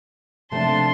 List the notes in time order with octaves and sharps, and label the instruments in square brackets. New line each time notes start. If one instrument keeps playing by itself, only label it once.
[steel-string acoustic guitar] C3 A3 [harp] F3 A#3 D#4 [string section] D4 A5 [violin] C6